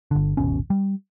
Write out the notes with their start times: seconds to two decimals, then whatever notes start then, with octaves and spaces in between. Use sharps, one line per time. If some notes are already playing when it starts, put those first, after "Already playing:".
0.11 G1 D3
0.37 D#1 G#1 B2 C#4
0.70 G3